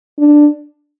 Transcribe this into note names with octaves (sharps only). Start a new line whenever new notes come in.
D4